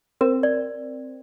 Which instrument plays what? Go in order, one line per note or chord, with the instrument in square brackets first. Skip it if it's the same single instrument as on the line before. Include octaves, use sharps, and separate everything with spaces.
[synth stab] C4 [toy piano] A#4
[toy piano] D5